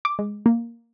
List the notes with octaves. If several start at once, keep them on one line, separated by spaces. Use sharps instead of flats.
D6
G#3
A#3